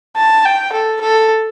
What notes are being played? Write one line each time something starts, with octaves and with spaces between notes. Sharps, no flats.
A5
G5
A4
A4